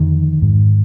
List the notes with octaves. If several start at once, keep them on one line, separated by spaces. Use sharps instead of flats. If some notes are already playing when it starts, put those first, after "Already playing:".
Already playing: F2 D3 D#3
G#2